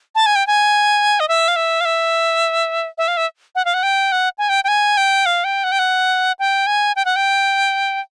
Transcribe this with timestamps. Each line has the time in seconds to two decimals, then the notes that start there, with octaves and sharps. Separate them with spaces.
0.15 A5
0.26 G#5
0.35 G5
0.47 G#5
1.20 D#5
1.28 E5
1.48 F5
1.56 E5
1.80 F5
1.85 E5
2.98 E5
3.08 F5
3.17 E5
3.55 F#5
3.65 F5
3.74 F#5
3.83 G5
4.12 F#5
4.38 G#5
4.49 G5
4.64 G5
4.68 G#5
4.97 G5
5.26 F5
5.44 G5
5.64 F#5
5.72 G5
5.79 F#5
6.39 G5
6.67 G#5
6.96 G5
7.05 F#5
7.16 G5